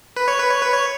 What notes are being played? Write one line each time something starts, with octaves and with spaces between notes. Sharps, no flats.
B4
C#5
B4
C#5
B4
C#5